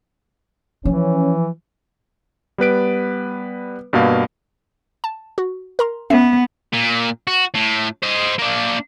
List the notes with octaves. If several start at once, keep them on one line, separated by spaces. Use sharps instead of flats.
E3 F3 C#4
G3 B3 B4 D7
G2 B2 A#3 F5
A5
F#4
A#4 A#5 C6
B3 C#4 E5 C7
A#2
F#4
A2
C5 D#5
A#3 D4